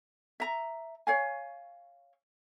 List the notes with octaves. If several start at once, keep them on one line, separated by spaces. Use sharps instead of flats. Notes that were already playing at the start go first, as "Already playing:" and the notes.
E5 A#5
C#5 F5 G#5